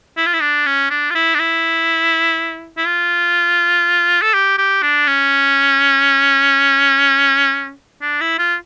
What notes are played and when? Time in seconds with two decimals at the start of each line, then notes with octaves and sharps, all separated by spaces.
0.17 E4
0.26 F4
0.34 E4
0.41 D4
0.66 C#4
0.91 D4
1.10 F4
1.15 E4
1.35 D4
1.39 E4
2.77 E4
2.86 F4
4.22 A4
4.34 G4
4.58 G4
4.82 D4
5.07 C#4
8.02 D4
8.21 E4
8.39 F4